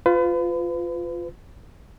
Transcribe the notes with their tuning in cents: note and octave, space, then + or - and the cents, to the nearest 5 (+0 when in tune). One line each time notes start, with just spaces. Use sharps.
F4 +0 B4 +35